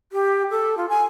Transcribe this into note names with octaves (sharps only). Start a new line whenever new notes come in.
G4
A4
F4
G#5